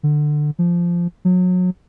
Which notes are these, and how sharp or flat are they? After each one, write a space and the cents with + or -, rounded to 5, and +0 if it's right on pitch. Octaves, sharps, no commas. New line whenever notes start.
D3 +20
F3 -10
F#3 -30